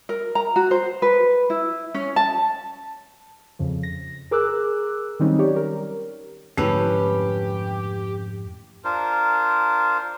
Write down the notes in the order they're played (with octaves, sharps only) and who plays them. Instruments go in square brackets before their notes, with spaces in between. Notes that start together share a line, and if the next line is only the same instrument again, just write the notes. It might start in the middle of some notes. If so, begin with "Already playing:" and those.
[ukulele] A#4
A#5
F#4
C5
B4
E4
C#4
A5
[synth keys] F2 C#3 F3
A#6
G#4 A#4 D6 E6 F#6
D#3 F#3 G3 C4 C#4 D#4
G4 C#5 D5
A#4
[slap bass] F2 G#2 D3 [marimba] A3 E4 [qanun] C#4 B4 [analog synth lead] G4
[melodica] D4 F4 A#4 C5